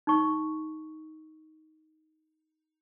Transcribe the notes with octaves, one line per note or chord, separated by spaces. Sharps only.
D#4 C#6